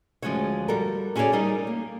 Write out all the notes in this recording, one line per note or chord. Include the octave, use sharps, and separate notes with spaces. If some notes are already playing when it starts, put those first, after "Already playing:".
D2 F3 G#3 C#4 F#4 C#5
G3 F#4 A4 A#4
C#4 F#4 G#4 A4 C#5 D5
G3 D#4 G#4 A#4
A#3